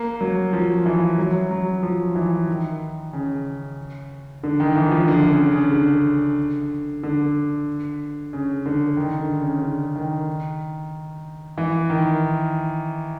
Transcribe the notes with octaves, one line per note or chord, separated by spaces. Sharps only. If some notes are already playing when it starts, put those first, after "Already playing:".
Already playing: A#3
F#3
F3
E3
F#3
F#3
F3
E3
D#3
C#3
D3
D#3
E3
F3
D3
C#3
C#3
D3
D3
C#3
D3
D#3
D3
C#3
D3
D#3
E3
D#3